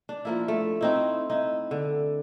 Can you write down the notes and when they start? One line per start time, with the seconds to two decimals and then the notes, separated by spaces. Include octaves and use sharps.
0.09 D4
0.25 F3 A#3 E4
0.48 A3
0.81 C4 D#4 E4
1.30 D#4 E4
1.71 D3